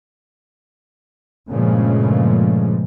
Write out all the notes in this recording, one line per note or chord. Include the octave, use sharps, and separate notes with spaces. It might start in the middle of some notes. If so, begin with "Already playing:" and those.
G2 A#2 C#3 F3 G#3 A3